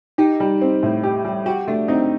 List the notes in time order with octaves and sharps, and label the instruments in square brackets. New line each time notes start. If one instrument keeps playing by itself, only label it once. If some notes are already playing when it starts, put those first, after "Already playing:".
[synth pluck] D#4 [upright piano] G4
[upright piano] G3
C4
A2
G4
G3
[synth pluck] F#4 [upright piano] G4
[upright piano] A3 [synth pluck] D4
[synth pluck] C4 [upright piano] D#4